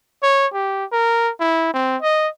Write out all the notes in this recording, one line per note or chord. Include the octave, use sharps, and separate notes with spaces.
C#5
G4
A#4
E4
C4
D#5